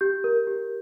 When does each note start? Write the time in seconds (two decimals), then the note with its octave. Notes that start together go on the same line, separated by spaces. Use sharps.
0.01 G4 G6
0.24 A#4
0.47 G4